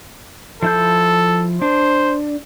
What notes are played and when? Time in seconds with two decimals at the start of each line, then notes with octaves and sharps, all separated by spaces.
0.63 F3 E4 A4 G6
1.62 D4 C5